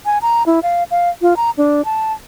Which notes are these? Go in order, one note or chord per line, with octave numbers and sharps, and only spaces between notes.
G#5
A#5
E4
F5
F5
F4
A#5
D4
A5